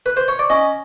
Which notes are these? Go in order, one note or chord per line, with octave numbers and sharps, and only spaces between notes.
B4
C5
C#5
D5
C#4 D#5